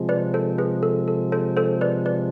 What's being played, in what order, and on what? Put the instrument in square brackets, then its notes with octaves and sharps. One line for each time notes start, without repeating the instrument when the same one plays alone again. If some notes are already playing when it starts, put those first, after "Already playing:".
Already playing: [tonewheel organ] C3 F3 G#3
[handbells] B4 D5
A4 C5
G#4 B4
A4
A4
A4 C5
A4 C5
B4 D5
B4 D5